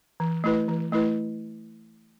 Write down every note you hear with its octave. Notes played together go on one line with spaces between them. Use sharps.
E3
A3 E4 B4
E3
A3 E4 B4